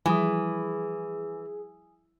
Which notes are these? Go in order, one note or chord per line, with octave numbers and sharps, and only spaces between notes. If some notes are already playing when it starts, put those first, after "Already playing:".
E3 F3 G3 G#4 G#5 D#6